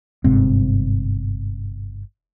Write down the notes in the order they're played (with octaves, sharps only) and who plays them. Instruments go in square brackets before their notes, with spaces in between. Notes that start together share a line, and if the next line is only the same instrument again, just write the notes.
[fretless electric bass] G1 G#2 C3 C4